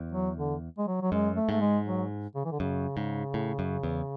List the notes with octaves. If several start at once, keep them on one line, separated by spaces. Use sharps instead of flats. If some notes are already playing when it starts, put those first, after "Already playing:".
Already playing: E2
F#3
D3
G#3
F#3
F#3
F#2 G#3
A3
G#2 A3
G#3
F#3
C#3
E3
D3
F#2 C#3
G#2
A2
F#2
E2